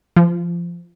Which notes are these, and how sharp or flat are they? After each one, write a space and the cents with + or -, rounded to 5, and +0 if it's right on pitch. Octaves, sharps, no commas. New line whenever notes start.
F3 -20